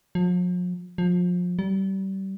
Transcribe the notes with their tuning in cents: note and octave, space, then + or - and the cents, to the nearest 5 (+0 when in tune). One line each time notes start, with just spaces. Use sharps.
F3 +45
F3 +30
G3 -30